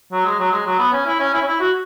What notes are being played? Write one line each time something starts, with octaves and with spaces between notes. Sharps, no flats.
F#3
G#3
F#3
G#3
F#3
B3
C#4
E4
C#4
E4
C#4
E4
F#4